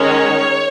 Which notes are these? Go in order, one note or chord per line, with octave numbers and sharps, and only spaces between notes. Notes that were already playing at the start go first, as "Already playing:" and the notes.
Already playing: D#3 G#3 C#4 C#5